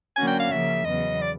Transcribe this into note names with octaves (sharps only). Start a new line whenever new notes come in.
D3 F#3 A#3 C#4 F#4 G#5
G5
F5
C#3 F3 A#3 E5
E2 C#3 F#3 B3 D#5
D5